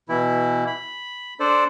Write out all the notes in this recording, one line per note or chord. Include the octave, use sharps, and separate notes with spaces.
B2 E3 E4
B5
D4 A4 C5 D5